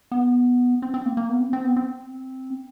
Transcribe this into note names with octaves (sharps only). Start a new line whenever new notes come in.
B3
C4
C4
A#3
A#3
B3
C4
C4
B3
C4